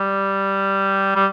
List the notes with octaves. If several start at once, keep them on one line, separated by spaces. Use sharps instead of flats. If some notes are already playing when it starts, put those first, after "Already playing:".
Already playing: G3
G3